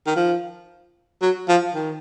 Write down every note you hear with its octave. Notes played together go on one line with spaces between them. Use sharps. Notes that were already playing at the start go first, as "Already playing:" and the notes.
D#3
F3
F#3
F3
D#3